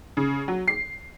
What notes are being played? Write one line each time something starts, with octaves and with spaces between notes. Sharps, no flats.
C#3
F#3
C7